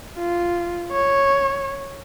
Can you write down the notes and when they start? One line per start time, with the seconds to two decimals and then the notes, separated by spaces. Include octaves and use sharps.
0.18 F4
0.92 C#5